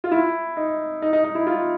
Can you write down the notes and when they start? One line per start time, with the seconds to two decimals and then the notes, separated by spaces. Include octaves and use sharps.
0.04 F4
0.11 E4
0.57 D#4
1.02 D#4
1.13 D#4
1.24 D#4
1.35 E4
1.47 F4